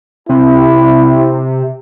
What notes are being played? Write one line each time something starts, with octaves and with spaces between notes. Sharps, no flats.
C3 E4